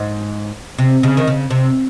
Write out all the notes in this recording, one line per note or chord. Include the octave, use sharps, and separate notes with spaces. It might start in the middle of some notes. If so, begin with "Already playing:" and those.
Already playing: G#2
C3
C#3
D#3
C#3
C3